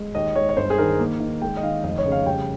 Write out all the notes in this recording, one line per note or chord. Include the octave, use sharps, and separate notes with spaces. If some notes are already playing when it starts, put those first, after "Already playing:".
Already playing: G#3
D#2 D#5
G#3 C#5
C#5
G1 C5
G#4
D#3 A#4
A#3
D#3
G#3 G5
D#5
D#3 F5
F1 D#5
C#5
C#3
F5
G3 G5